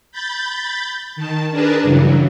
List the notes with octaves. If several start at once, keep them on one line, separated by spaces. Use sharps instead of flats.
B5 G6 A6
D#3 A5
D4 G#4 A#4 B4 A5
G2 C#3 E3 F#3